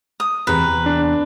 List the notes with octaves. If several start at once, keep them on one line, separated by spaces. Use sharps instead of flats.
D#6
E2 C3 B4 A#5
D4